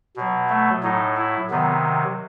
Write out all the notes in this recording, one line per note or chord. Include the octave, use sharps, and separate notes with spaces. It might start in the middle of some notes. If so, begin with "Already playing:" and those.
B2 F#3
A3
A2 F#3 D#4
E4
C3 D#3 F#3 B3